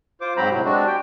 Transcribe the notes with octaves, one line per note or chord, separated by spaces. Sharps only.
F4 C5 D6
G#2 F#3 C4 C5 A#5 B5
A2 C3 F#3
G#3 C4 D4 F#4
G4 G5